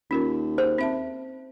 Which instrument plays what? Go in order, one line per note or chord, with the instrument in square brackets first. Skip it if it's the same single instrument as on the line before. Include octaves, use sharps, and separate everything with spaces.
[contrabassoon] D#2 [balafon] C#4 F4 A#4
[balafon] G#4 [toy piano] C5
[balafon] C4 E5 A5